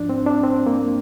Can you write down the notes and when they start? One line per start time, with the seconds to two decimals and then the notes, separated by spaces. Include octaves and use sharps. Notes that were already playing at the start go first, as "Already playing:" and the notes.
Already playing: G#2 F3 D4
0.09 C4
0.27 D4
0.44 C4
0.66 A#3